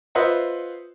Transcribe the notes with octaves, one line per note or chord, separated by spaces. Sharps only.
F4 B4 C5 D#5 E5 F#5